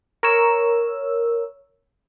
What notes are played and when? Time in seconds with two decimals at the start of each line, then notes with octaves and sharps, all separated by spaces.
0.23 A#4 C#5 E6